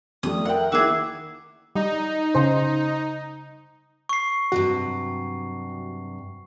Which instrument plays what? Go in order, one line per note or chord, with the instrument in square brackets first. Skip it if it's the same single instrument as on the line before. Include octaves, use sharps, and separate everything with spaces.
[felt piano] F2 G3 A3 [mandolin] D#6
[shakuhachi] A#4 [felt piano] E5 G5 [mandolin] F#5
[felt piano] D#3 A#3 E4 [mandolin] F#4 G#4 [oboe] E5 [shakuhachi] D6
[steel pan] G3 [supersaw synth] D#4
[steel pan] C#3 C5
[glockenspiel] C#6 C7
[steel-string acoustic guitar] G2 C3 F#3 [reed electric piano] F#4